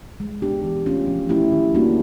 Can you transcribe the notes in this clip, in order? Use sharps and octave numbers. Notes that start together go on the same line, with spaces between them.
G#3
B3 D4 G4
E3
A3 C#4 F4
F3
A3 C#4 E4 G4
D#3
G3 A#3 D4 F#4